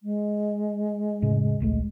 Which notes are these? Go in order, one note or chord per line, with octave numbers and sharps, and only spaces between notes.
G#3
F1 A2 C#3
D1 A#1 A3